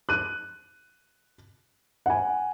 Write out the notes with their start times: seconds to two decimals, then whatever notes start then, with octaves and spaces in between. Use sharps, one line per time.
0.09 F#6 D#7
2.06 F#5 G#5